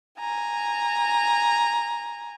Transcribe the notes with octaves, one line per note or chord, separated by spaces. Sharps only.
G#5 A#5